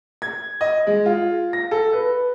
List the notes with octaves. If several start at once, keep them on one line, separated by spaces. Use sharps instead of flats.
G#6
D#5
G#3
F4
A#6
A4
B4